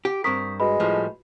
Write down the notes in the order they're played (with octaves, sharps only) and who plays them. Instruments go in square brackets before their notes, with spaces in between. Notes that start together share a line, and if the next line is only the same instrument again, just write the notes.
[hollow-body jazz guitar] G4
[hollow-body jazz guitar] G2 C4 A#4 [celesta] C#6 D#6 B6
[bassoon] G#3 [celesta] F#4 B4 B5
[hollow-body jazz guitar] A2 F3 G3